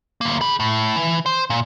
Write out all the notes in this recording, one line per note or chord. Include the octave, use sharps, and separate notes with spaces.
D2 A#3
G#4 B5
A2
E3
C5
A#2